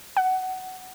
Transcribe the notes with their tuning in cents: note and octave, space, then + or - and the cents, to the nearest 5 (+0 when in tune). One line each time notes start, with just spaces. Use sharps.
F#5 +15